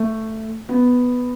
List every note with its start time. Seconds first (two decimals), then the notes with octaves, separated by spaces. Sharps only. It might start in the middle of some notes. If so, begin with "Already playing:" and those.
Already playing: A3
0.69 B3